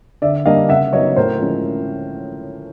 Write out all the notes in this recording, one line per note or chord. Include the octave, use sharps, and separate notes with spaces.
D3 D5 E5
G3 A#3 D4 D#5 F5
C#3 E5 F#5
F#3 B3 D#4 C#5 D#5
A2 A#4 C5
F3 G#3 C#4